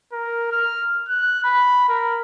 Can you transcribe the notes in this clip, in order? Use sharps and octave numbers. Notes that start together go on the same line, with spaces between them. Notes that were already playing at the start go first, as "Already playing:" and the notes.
A#4
F6
F#6
B5
A#4